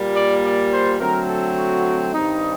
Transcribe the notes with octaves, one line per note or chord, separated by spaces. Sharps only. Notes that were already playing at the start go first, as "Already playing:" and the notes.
Already playing: A#2 G3 A#3
D5
D5
C5
D3 F#3 A3 C4 A#4
A4
F#4
G2 D#3 G3 C4 D#4